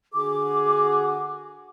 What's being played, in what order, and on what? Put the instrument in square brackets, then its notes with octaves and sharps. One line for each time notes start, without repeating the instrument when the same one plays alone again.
[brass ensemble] D3 F#4 G#4 [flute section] D6